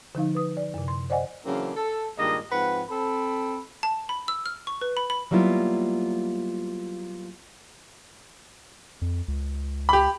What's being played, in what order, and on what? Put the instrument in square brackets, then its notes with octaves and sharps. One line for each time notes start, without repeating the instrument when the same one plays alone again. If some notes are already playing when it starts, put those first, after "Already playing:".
[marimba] D3 F3 D#4 F5
B4 D#6
D5
F#2 C3
C6
C5 D5 D#5 F#5 G#5
[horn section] C#3 E3 F#3 A#3 C4 D4
A4
G2 A#2 D#3 G#3 A#3 D#5
G#2 F3 C4 B4 F#5
C4 A4 B5
[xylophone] A5
B5
E6
F6
C#6
B4
B5
B5
[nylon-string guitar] F#3 G3 A#3 B3 E4 F4
[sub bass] F2
C#2
[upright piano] G4 B5